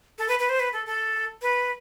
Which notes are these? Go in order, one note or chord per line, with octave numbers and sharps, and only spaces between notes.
A4
B4
B4
C5
B4
A4
A4
B4